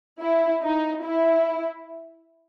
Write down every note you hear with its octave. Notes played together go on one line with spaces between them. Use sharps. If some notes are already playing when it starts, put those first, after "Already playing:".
E4
D#4
E4